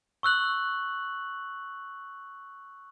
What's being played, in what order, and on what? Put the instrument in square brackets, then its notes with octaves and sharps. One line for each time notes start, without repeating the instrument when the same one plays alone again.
[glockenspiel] C#6 E6 F#6 F#7